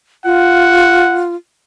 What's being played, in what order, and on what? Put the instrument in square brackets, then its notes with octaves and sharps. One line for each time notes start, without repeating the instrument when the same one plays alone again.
[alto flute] F4 [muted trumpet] F#5